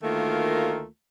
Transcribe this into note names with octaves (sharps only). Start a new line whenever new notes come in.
D2 D#3 A3 A#3 F4 A#4